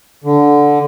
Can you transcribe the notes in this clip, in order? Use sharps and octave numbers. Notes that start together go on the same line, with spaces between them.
D3